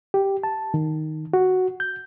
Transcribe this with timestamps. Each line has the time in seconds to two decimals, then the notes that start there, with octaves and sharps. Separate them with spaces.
0.14 G4
0.43 A5
0.74 D#3
1.33 F#4
1.80 G6